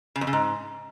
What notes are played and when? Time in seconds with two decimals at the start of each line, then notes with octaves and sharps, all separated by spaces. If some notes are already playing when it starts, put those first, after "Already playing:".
0.16 C#3
0.21 F2
0.27 C#3
0.33 G#2